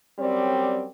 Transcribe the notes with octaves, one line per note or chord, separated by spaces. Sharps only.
F#2 G3 C4 C#5 D5